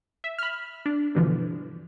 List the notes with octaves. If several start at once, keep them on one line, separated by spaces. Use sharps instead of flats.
E5
B5 F6
D4
G2 B2 D3 E3 F3